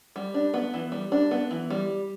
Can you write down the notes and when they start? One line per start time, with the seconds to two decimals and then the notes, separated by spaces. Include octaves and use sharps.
0.16 G3
0.34 D4
0.54 B3
0.74 E3
0.92 G3
1.12 D4
1.31 B3
1.51 E3
1.70 G3